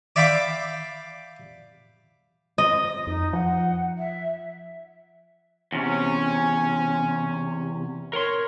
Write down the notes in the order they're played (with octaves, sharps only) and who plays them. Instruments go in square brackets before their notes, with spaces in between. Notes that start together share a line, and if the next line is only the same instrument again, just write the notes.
[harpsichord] D5 E5 F5 G5 B5 D6
[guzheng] D#5
[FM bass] F2 [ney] D#4
[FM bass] F3 [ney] F#5
[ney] E5
[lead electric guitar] E2 C3 [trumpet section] C#4
[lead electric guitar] A#4 C6 [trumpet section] C#5